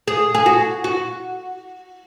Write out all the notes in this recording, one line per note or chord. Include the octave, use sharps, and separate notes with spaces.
G#4
G#4
F#4
F#4